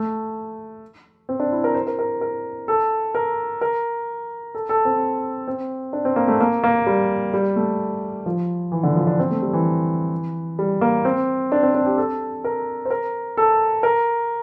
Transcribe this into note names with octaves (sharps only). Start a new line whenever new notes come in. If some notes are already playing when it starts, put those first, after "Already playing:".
Already playing: A3
C4
D4
E4
A#4
C5
A#4
A#4
A#4
A4
A#4
A#4
A4
A4
C4
C4
D4
C4
A#3
A3
A#3
A#3
G3
G3
A3
F3
E3
D3
F3
D4
C4
A3
G3
E3
G3
A#3
C4
D4
C4
D4
G4
A4
A#4
C5
A#4
A4
A#4